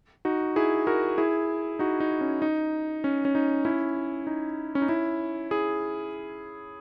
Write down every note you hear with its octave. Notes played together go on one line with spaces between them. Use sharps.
D#4 F#4
E4 G#4
F#4 A#4
E4 G#4
D#4 F#4
D#4
C#4
D#4
C#4
C#4
D#4
C#4 E4
D#4
C#4
D#4
C#4 E4
E4 G#4